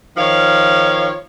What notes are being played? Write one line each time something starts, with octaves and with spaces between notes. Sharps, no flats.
D#3 F3 C#5 F5